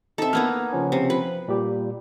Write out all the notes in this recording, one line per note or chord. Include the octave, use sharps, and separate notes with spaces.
C4 D#4 A4 E5
A#3 B3 D#4 F6 G#6
C#3 F3 C#4
C3
F3 B4
A#2 G3 G4